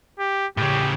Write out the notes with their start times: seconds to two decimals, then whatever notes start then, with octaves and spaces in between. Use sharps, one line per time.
0.19 G4
0.57 A2 C#3 G4